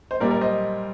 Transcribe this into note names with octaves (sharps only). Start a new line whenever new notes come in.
C5
A#2 G3 A#4 D5
A#4 D5
C5 D#5